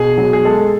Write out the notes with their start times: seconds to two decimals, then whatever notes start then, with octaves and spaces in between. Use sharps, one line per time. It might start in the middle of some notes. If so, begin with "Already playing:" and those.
Already playing: B2 G#4
0.18 F#3
0.33 G#4
0.45 G#3 A4